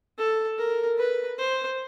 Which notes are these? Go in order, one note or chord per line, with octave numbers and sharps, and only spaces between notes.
A4
A#4
B4
C5